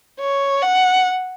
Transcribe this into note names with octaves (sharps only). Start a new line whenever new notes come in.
C#5
F#5